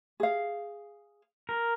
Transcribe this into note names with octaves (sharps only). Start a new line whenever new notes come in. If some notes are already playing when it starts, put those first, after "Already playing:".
G#4 F5
A#4